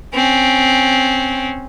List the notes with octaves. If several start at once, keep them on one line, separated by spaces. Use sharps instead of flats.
C4 C#4